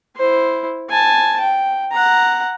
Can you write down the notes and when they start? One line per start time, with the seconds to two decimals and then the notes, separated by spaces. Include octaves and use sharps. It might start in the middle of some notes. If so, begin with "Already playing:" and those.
0.16 E4 C5
0.90 G#5 A5
1.40 G5
1.92 F#5 A#5